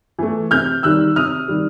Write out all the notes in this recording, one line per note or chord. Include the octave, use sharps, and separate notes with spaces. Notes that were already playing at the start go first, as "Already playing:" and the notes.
E3 A3
C3 F6 G6
D#3 G3 E6 F#6
C3 D#6 F6
D#3 G3